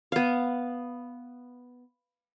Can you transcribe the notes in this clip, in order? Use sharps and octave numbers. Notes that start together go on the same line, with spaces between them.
B3 F5